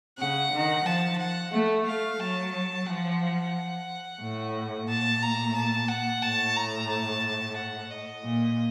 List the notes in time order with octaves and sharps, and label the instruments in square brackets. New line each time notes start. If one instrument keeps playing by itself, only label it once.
[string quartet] C#3 [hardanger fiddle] F#5
[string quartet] D#3
[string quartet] F3 [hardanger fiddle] A5
[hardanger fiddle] F#5
[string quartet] A3
[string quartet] A3 [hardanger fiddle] F5
[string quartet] F#3 [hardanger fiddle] A5
[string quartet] F3 [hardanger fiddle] F#5
[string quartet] A2
[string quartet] A#2 [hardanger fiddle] A5
[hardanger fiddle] A#5
A5
F#5
[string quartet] A2 [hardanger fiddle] A5
[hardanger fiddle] A#5
A5
F#5
D#5
[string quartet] A#2